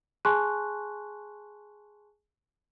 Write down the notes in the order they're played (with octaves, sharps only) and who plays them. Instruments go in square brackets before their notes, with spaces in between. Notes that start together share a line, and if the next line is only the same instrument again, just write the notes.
[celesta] G#4 G#5 A5 C6 C#6 F#6